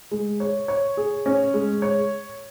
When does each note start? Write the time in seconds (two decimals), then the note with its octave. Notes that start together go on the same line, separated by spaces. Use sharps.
0.11 G#3
0.40 C#5
0.68 C#5
0.97 G#4
1.26 C#4
1.54 G#3
1.82 C#5